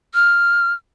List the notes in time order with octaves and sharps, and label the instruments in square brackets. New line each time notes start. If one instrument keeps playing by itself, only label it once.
[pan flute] F6